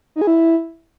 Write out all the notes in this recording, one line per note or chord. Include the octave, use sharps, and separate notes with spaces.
D#4
G#4
E4